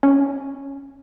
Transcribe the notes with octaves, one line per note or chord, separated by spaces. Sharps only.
C#4